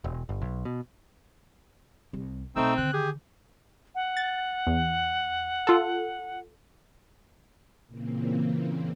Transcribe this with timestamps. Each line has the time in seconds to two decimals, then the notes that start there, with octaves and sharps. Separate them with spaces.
0.04 E1
0.29 G1
0.42 B1
0.65 B2
2.13 C2
2.56 B1 A3 C4 D#4 E6
2.77 D3 D#3 F#6
2.93 G4 G#4
3.95 F#5
4.17 A6
4.67 E2
5.67 F4 A4
7.87 A#2 C#3 E3 A#3 C4